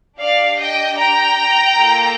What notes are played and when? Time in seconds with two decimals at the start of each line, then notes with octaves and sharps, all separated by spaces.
0.19 D4 G4 D5 F5
0.57 D#5 G5
0.97 G5 A#5
1.76 A#3 F4 A4